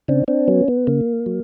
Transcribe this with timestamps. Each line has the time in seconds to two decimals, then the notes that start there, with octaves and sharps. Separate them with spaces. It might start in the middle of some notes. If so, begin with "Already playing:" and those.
0.08 C#3 C4 D4
0.28 C4 D4
0.48 F#3 B3 C#4
0.68 B3
0.87 C#3 A#3
1.26 F#3